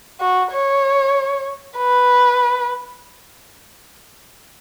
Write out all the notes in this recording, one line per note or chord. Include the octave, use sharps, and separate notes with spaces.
F#4
C#5
B4